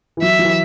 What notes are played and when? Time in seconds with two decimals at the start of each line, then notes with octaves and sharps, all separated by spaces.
0.17 E3
0.22 F#3 E5
0.39 F#3
0.45 E3